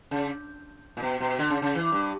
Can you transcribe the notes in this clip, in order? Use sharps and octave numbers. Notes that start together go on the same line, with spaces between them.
C#3
A#2
B2
B2
D3
C#3
C#3
E3
G2